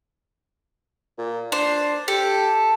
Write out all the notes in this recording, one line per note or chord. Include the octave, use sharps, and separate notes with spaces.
A#2
D4 C5
G4 A4